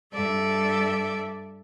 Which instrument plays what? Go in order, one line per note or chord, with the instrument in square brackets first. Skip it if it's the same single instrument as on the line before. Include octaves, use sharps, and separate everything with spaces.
[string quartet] G2 A4 D5 E5